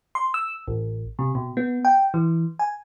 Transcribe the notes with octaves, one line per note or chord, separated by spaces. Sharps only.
C6
E6
A1
C3
B2
B3
G5
E3
G#5